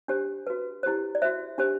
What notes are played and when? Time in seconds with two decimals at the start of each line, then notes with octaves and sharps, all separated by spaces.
0.08 D4 G4 C5
0.47 F#4 B4
0.83 E4 G4 C5
1.15 D5
1.22 F#4 C5 E5
1.58 D4 G4 C5